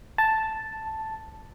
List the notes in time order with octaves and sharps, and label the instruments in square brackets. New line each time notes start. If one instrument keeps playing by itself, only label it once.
[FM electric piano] A5